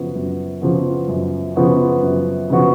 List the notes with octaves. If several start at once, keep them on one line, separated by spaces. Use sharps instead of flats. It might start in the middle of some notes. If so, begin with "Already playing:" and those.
Already playing: F#2 C#3 F3 B3 F#4
F#2
C#3 F3 B3 F#4
F#2
C#3 F3 B3 F#4
F#2
C#3 F3 B3 F#4